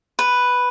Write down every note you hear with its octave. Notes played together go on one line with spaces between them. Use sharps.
B4